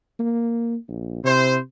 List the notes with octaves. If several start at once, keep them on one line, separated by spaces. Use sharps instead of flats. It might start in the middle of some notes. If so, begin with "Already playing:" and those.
A#3
A#1
C3 E4 C5